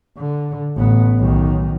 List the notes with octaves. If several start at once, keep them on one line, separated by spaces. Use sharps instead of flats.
D3
A1 B3
B1 D#3